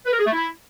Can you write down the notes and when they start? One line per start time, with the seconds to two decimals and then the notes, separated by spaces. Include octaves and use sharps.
0.06 B4
0.12 A#4
0.19 G#4
0.26 A3
0.33 E4